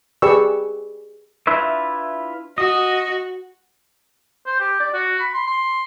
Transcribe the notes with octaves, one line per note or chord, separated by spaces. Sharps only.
G4 G#4 B4 D5 C#6 E6
D4 E4 F4 B4 E5
F#4 D#5
C5
G4
D5
F#4
B5
C6
C6